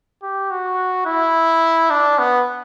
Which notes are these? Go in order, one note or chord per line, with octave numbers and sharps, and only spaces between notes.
G4
F#4
E4
D4
B3